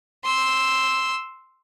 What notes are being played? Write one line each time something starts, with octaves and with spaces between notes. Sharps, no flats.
C6 E6